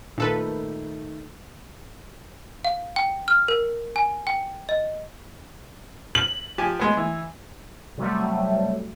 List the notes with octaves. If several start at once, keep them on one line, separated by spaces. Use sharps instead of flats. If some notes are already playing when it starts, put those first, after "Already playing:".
A#2 D#3 A3 A4 B4
F5
G5
F6
A#4
G#5
G5
D#5
F#7
F3 G4 G#5
G#3 B3
E3
C3 F#3 G3 A3